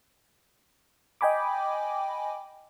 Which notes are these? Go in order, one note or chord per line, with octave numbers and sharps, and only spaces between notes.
D#5 G5 G#5 B5 D6